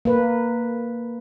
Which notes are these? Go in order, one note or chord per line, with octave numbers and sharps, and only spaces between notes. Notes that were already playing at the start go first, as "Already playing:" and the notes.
A#3 B4